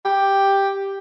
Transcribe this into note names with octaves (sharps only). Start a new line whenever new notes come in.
G4